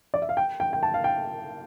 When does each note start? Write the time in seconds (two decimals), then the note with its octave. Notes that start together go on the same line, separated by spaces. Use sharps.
0.14 D5
0.22 E5
0.29 F5
0.37 G5
0.60 G5
0.73 G5
0.83 A5
0.94 F5
1.04 G5